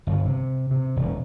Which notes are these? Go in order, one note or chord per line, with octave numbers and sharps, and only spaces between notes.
G1
C3
C3
E1